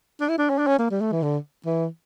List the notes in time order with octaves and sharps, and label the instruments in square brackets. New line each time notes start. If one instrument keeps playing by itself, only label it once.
[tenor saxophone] D4
E4
D4
C#4
D4
C#4
A#3
G3
A3
E3
D3
E3